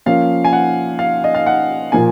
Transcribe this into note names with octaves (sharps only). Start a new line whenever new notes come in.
F3 A#3 C#4 F5
G#5
F#5
F5
D#5
F5
F#5
A#2 F3 A#3 G#5